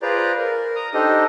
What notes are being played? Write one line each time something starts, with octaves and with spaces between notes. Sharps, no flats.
F4 G#4 B4 C5 D5 A#5
A#4
A#5 D#6
D4 D#4 G4 A4 C5 D#5